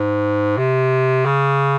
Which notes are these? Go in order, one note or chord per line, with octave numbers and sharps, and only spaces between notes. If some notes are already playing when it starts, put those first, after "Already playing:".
Already playing: G#2
C3
C#3